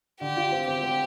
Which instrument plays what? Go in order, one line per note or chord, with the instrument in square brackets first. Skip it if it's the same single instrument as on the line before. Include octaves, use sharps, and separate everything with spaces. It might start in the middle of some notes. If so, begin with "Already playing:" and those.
[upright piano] D3 [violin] G4
[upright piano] F4
C4
[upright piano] C4 [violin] G4
[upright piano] C4